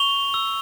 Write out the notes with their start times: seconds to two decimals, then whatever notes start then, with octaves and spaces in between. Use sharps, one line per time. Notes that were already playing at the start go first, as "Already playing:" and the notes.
Already playing: C#6 F7 G7
0.34 E6